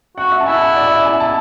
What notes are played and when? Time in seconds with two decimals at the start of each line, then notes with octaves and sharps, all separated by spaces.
0.17 F#4 F#5
0.32 E5
0.40 A5
0.46 E4 G#5
0.62 F#5
0.76 D5
0.91 E5
1.05 G#5
1.20 A5